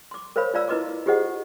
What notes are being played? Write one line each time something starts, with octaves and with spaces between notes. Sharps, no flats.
C6 D6
A#4 C5 C#5 F5 B5
F4 C#5 D5 F5 A#5 E6
E4 F4 B4 D#5 C6 D6
F4 G4 G#4 C5 D#5 F#5